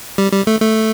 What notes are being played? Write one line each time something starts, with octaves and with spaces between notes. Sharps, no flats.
G3
G3
A3
A3